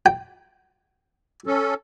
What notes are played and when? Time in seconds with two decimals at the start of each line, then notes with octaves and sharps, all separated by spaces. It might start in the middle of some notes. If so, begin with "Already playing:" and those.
0.06 G5
1.47 C#4 A4